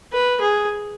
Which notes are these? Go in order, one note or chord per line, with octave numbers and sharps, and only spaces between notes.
B4
G#4